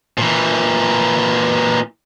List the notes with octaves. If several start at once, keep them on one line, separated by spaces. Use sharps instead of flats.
A#2 E3